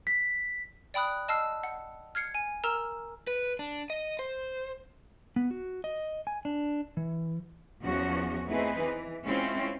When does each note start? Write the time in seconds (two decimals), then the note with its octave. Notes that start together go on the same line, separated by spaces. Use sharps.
0.07 B6
0.94 D5 G5 B5 D#6 F#6
1.28 D#5 A5 E6 F6 C7
1.64 F#5
2.15 F6 G#6 C7 C#7
2.34 G#5
2.64 A#4 A#5 E6 F6 E7
3.27 B4
3.59 D4
3.90 D#5
4.19 C5
5.36 B3
5.51 F#4
5.84 D#5
6.27 G#5
6.45 D4
6.97 E3
7.83 E2 F3 C#4 F#4
8.48 A3 C4 D#4 E4 G#4 B4
8.80 E3
9.24 G#3 C4 C#4 E4 F4